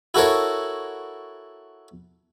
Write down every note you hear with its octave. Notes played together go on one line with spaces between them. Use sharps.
E4 F#4 A4 A#4 C#5